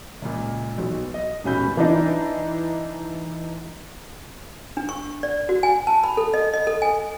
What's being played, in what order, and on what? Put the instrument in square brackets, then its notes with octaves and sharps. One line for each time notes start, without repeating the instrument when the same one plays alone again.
[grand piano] C#2 A#2
B1 B2
D#5
D#1 G#2 B2 C#4 B5 G6
[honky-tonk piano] E3 D4 D#4
[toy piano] D4
C#6
D5
F#4
G#5
A5
B5
A4
D#5
D#5
A4
G#5